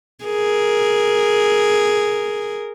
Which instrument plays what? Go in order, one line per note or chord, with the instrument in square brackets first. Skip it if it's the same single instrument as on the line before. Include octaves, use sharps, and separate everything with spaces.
[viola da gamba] G#4 A#4